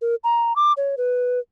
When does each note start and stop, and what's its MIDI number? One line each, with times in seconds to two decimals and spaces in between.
0.02 0.15 70
0.24 0.53 82
0.56 0.73 86
0.77 0.95 73
0.98 1.40 71